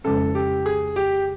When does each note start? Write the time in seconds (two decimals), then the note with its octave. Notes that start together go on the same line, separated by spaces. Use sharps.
0.04 F2 C#3 F3 G#3 C#4 A4
0.35 G4
0.66 G#4
0.96 G4